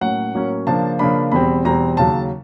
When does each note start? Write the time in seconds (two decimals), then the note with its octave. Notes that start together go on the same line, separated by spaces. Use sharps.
0.01 A2 F#3 A#3 C#4 F#5
0.34 A2 F#3 A#3 C#4
0.67 C#3 F3 A#3 D4 A5
0.99 C#3 F3 A#3 D4 B5
1.32 E2 B2 G3 C4 B5
1.64 E2 B2 G3 C4 A#5
1.97 D#2 C#3 F#3 A5